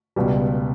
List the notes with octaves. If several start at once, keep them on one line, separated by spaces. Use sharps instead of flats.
C#2 B2 G3